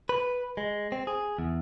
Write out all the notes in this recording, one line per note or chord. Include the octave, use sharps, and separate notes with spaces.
B4
G#3
C4
G#4
E2